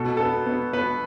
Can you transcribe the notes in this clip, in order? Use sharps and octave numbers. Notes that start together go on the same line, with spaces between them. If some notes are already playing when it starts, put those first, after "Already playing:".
Already playing: B2 A4
B3 A4
B3
B3 B4